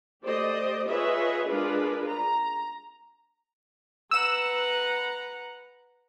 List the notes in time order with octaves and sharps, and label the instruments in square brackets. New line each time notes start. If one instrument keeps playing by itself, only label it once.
[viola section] A3 G4 C5 D5 D#5
F4 G#4 B4 C#5 D#5 E5
G#3 D4 F4 G#4 A#4 B4
A#5
[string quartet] B4 F#5 A#5 [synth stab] E6 E7